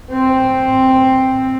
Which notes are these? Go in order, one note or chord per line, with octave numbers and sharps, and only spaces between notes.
C4